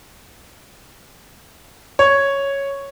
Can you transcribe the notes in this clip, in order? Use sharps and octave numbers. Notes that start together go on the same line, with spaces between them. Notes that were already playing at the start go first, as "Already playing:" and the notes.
C#5